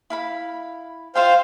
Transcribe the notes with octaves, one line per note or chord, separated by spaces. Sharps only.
E4 F5 B5
F4 C5 E5 F5 G5